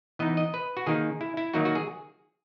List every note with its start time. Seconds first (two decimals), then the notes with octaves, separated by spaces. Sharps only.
0.19 E3 B3 D#4 D#5
0.37 D#5
0.54 B4
0.77 F#4
0.86 D#3 A#3 D#4 G#4
1.21 E4
1.37 E4
1.54 D#3 F#3 A#3 D#4 F#4
1.65 F#4
1.75 G#4